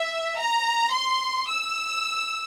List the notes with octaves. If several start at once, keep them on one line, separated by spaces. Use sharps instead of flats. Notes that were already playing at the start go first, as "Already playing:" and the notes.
Already playing: E5
A#5
C6
E6